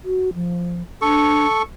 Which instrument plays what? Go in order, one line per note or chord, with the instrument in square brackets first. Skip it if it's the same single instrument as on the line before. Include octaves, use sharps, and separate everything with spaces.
[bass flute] F#4
F3
[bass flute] D4 [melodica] A4 C#6